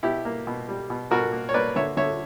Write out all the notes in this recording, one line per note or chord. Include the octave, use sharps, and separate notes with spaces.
B2 E4 G4
A#3
B2
G3
B2
B2 F#4 A#4
A#3
C#5
A#3 B4 D5
D3 C#5 E5
D3 C#5 E5